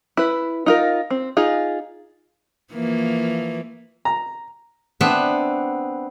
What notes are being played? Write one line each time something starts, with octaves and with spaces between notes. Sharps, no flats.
E4 B4
D#4 F4 A#4
C4
D#4 F4 G#4
E3 F3 A#3
A#5
B3 C4 D4 E5 F#5